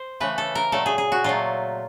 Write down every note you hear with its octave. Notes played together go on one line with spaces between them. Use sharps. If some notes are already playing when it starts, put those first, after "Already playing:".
Already playing: C5
C#3 E3 A3 B4
A4
A#4
A#2 F#3 A3 A4
G#4
G#4
F#4
A#2 F#3 A3 F4